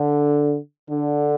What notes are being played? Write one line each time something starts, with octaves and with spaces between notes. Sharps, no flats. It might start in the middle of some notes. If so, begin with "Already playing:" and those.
Already playing: D3
D3